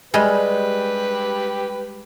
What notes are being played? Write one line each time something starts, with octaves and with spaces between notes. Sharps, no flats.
G3 G#3 G4 B4